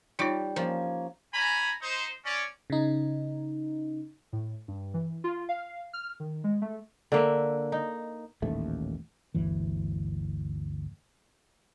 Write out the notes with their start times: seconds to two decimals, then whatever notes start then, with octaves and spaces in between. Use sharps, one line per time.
0.19 G3 D#4 F4 G4 C#5
0.56 F3 A#3 C#4
1.34 C#4 G#5 A#5 B5
1.81 D#4 C5
2.25 C#4 D5
2.70 C#3 D#4
4.33 A2
4.68 G2
4.94 E3
5.24 F4
5.49 F5
5.93 F6
6.20 D#3
6.44 G#3
6.62 A3
7.12 D3 A#3 E5
7.72 D#4
8.42 D#1 A1 D#2 A3
9.35 G1 D2 E3